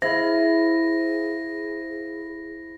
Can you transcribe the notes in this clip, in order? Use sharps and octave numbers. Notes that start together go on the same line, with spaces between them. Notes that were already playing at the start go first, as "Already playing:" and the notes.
E4 G#4 C5 F5 A#6